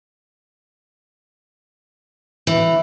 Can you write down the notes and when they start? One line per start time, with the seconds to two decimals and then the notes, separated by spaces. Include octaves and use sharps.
2.47 E3